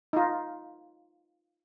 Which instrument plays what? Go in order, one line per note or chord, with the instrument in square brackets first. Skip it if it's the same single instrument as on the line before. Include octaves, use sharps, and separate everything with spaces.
[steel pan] D#4 F4